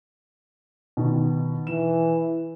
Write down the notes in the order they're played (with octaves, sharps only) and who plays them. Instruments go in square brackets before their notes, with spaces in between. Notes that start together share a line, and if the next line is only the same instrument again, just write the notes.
[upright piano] B2 D#3
[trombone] E3 [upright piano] E7